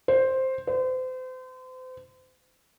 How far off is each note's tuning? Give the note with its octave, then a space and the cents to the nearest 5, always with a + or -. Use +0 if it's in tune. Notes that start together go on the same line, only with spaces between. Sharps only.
C5 +5
C5 -35